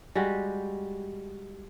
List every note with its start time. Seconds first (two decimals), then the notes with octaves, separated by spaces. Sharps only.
0.15 G3 G#3 F#4 G4